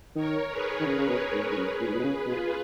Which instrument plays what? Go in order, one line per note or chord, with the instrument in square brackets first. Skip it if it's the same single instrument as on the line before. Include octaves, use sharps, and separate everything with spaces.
[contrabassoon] D#3 [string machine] A#4 C#5
[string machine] G#4 B4
[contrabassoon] D#3
[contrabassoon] C#3 [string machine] A#4 C#5
[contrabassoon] C#3
B2
[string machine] G#4 B4
[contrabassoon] G#2
G#2
[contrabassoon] F#2 [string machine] G#4 B4
[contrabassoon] A#2
G#2
A#2
B2
C#3
[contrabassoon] B2 [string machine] F4 G#4